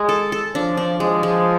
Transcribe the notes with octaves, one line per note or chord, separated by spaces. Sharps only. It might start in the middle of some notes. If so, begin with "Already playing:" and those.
Already playing: G#3
A4
A4
F3 D4
D4
F3 G#3
G#3